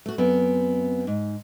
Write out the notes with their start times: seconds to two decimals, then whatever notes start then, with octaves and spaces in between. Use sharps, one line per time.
0.06 A3 F#4
0.18 F#2 B3 C4
1.07 G#2